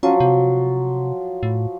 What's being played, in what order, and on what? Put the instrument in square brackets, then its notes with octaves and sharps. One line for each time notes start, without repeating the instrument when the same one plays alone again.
[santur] F3 F#3 [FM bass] C#4
[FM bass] C3
A2